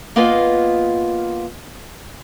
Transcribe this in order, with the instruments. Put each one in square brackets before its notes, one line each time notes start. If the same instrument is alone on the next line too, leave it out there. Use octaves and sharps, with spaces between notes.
[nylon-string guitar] A#3 B3 F4 B4 D#5 G#5